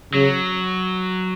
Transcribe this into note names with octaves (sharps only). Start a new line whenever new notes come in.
C#3 F#3